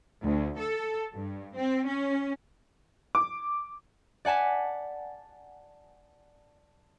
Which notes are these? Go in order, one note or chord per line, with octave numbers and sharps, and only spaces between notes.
D2
A4
G2
C4
C#4
D6
D5 F#5 G#5 A5 B6